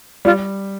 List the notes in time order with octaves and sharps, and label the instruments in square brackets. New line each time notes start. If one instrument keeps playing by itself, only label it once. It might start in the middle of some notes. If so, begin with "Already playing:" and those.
[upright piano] G3 [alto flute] F4